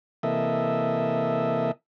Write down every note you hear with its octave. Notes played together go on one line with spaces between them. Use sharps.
C3 E3 A#3 A4 D#5 E5